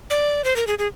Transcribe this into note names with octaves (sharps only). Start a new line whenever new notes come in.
D5
C5
A#4
G#4
G#4